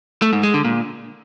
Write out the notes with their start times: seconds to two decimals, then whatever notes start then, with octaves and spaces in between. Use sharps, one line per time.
0.22 A3
0.33 G#2
0.43 G#3
0.54 D3
0.65 A#2